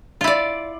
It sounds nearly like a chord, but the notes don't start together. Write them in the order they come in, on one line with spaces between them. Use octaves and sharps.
F4 E4 D5